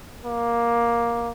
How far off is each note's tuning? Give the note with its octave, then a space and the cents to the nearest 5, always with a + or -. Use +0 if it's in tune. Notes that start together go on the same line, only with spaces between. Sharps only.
A#3 +10